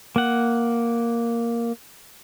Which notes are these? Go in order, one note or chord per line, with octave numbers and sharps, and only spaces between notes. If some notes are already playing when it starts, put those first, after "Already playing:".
A#3 F#5